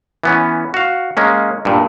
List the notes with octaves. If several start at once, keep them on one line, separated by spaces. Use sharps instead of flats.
E3 B3 C#4
F#4 F5
G#3 A#3 C#4
G2 A#2